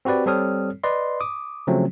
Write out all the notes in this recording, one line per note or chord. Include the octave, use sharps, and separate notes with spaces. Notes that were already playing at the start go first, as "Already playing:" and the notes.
C4 F#4 G4 B4 D5
G3 C4 A4 C#5 D#6 F6
B4 D5 D#5 C6
D6 D#6
C#3 F3 F#3 A3 C4 C#4